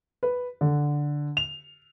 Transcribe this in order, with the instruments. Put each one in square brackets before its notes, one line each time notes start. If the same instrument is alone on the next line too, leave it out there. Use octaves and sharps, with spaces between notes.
[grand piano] B4
D3
F7